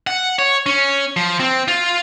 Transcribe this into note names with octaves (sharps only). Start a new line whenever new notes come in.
F#5
C#5
C#4
F3
C4
F4